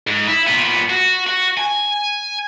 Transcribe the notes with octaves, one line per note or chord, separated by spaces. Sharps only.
G#2
E4
A#2 B3
F#4
F#4
G#5